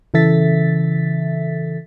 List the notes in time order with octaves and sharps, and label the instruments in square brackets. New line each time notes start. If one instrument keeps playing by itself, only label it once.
[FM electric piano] C#3 E3 A4 E5 A6 B6